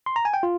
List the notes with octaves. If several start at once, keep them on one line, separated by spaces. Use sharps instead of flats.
C6
A#5
G#5
G5
F4